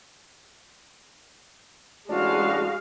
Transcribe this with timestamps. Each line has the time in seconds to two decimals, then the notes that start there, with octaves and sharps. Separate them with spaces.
2.09 A1 G#3 D4 F#4 F5